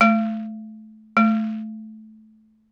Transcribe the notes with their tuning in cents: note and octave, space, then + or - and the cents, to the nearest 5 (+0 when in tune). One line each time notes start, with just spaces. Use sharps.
A3 -20
A3 -15